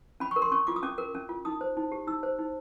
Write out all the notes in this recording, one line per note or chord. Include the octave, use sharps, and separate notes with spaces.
C#4 B5
C#6
A#4
C6
C#4 C#6
F4 D6
D#6
C#4 D6
A#4
C#4
F4
D#4 D#6
C5
D#4
G4
D#4 E6
C5
D#4